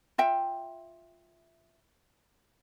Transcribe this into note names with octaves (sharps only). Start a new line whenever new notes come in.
F4 E5 G5